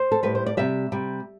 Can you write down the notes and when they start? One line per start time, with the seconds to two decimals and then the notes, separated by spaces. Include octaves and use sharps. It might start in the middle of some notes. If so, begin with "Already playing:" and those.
Already playing: C5
0.12 A4
0.23 A2 G3 B4
0.35 C5
0.46 D5
0.57 C3 G3 E5
0.92 C3 G3